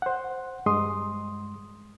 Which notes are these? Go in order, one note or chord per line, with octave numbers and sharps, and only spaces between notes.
C5 F#5
G2 G#3 C6 D#6